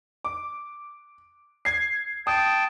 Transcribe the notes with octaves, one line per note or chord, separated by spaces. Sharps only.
D6
G#6 C7
G5 A5 D#6